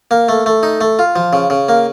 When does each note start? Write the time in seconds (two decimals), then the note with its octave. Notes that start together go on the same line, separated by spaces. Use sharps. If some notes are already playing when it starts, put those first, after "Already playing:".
0.11 A#3
0.29 A3
0.46 A3
0.63 D#4
0.81 A3
0.99 F4
1.16 F3
1.33 C#3
1.50 C#3
1.69 A#3